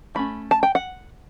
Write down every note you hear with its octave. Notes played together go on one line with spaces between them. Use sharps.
E3 A3 C#4 B5
A5
G5
F#5